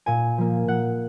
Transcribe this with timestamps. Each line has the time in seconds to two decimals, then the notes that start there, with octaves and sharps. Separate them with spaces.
0.06 A#2 G#5
0.38 F3 A#3
0.68 A#2 F#5